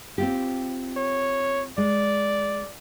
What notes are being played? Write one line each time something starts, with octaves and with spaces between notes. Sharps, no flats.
C4 F4 G4
C#5
G#3 D5